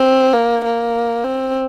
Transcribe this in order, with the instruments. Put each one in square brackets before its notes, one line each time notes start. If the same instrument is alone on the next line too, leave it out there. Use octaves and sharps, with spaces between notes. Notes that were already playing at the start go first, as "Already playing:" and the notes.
Already playing: [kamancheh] C4
A#3
A#3
C4